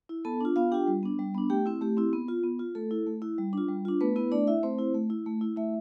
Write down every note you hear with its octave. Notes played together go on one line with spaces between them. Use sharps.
E4
B3 A4 A5
D4 F4
B3 F4 F5
D4 F4 G4 G5
G3
B3 D4
G3
B3 D4
A3 G4 G5
C4 E4
A3 G4
C4 E4
B3
F4
B3
F4
A3 A4
E4
A3
E4
G3
D4 F4
G3
D4 F4
A3 B3 B4
B3 E4 B4
A3 D4 D5
E4 E5
A3 C4 C5
E4
A3
E4
A3
E4
A3 E4 E5